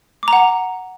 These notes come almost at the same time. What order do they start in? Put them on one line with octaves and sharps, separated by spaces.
D6 A#5 F#5